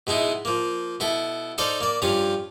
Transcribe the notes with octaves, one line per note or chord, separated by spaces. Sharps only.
B2 G#3 D#4 E4
F3 A#3
B2 E4 A4
D#4 A4 C5 D5 F5
A#3 D5
G2 F3 C#4 F5